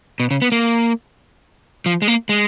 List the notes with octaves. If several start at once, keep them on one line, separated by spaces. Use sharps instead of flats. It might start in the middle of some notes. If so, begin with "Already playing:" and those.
B2
C#3
B3
A#3
F3
G#3
A#3
G#3